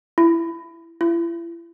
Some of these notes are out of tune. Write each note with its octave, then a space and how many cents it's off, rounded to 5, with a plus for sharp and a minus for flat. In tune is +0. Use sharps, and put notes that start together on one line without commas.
E4 +20
E4 +40